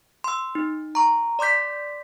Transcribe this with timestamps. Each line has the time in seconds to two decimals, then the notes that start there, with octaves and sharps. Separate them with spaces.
0.24 C6 E6
0.55 D#4
0.95 A#5 C#6
1.39 D5 C6 D6 G6 B6